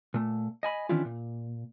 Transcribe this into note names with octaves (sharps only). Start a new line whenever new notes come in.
A#2 A3
D#5 G#5 B5
D#3 E3 C#4 D4 E4 F4
A#2